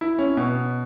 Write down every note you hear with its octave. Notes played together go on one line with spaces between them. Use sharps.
E4
C#4
B2